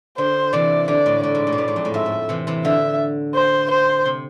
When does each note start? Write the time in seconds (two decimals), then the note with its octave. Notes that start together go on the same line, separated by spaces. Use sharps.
0.18 D3 C5
0.53 C3 E3 D5
0.88 D3 D5
1.06 A2
1.23 A2 D5
1.35 G#2
1.47 A2
1.52 B2
1.58 A2
1.68 G#2
1.76 F2
1.85 A2
1.94 G#2 E5
2.06 A2
2.29 C3 E3
2.47 C3 E3
2.65 D3 E5
3.35 C5
3.71 C5
4.06 C3